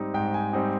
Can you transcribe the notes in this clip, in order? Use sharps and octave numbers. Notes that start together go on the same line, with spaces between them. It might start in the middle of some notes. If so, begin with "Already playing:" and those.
Already playing: G#2 G3 C4 D#4
G#2 G5
G#5
G3 C4 D#4 G5